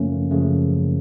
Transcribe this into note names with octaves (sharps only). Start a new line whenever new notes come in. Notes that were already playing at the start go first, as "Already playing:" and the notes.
Already playing: F#2 C#3 F3 A3 A#3 C#4
F#2 C#3 F3 A3